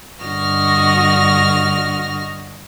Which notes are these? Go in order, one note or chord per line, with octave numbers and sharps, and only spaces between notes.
G2 D3 F#4 D#5 F6 A#6